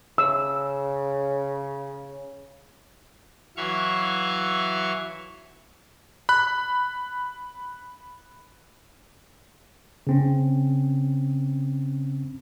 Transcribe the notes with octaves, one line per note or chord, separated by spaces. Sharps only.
C#3 E6
E3 F#3 E5 F5 C#6
B5 F#6
C#3 C4 C#4